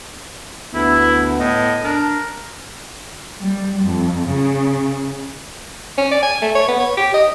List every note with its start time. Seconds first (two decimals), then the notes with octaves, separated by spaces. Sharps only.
0.74 D2 B3 E4
1.40 A2 D#5
1.84 D4 A#4
3.40 G3
3.84 F2
4.28 C#3
5.98 C#4
6.11 D5
6.22 G#5
6.42 A3
6.55 C#5
6.68 B3
6.80 C#5
6.97 G4
7.14 D#5